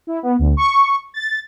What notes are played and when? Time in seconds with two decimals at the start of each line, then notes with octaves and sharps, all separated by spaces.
0.07 E4
0.23 B3
0.39 D2
0.57 C#6
1.14 A6